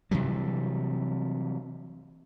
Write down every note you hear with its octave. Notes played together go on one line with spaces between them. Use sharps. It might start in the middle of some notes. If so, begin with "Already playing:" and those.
C3 E3 F#3 G3